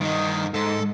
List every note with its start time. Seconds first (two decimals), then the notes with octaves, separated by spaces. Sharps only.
0.01 G2 D#3 D#5
0.54 G#2 A4